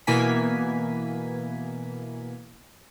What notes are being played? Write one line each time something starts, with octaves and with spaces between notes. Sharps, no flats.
B2 E3 A#3 G#5 B6